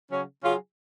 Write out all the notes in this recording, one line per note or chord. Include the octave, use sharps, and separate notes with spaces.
C#3 F#3 C#4
C#3 F#3 C#4 F4 G#4